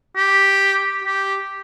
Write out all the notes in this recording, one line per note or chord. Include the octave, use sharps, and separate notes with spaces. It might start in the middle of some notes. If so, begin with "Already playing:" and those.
G4
G4